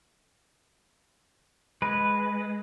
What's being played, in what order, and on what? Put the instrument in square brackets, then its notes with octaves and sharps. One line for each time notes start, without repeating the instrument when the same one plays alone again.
[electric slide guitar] G#3 [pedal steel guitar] B4